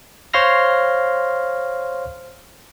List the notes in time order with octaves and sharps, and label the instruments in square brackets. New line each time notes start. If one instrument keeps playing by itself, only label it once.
[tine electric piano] C5 C#5 F5 C6 F6 A#6